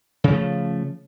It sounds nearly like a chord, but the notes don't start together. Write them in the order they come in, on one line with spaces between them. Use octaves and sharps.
C#3 F3 A3